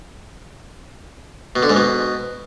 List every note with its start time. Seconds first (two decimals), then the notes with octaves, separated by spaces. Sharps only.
1.56 B2
1.63 D3
1.70 G#2
1.77 B2